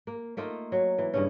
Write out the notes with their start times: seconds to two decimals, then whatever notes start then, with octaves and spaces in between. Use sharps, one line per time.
0.07 A#3
0.37 A3 A#3 D#4 F4
0.72 F#3
0.98 E3
1.14 G2 C#3 C#4